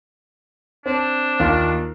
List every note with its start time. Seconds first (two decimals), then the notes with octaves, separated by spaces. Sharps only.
0.86 C4 D4
1.40 D#2 F4